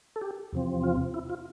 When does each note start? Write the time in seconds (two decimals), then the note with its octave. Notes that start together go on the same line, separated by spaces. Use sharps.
0.16 A4
0.21 G4
0.53 E2 C3 F3 C4
0.83 F4
1.14 E4
1.30 F4